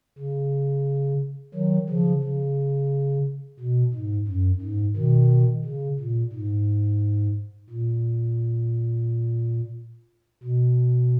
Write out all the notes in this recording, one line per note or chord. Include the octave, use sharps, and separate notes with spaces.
C#3
D#3 F#3
C#3 F3
C#3
B2
G#2
F#2
G#2
B2 D#3
C#3
A#2
G#2
A#2
B2